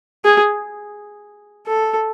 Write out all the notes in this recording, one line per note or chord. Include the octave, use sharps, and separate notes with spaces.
G#4
A4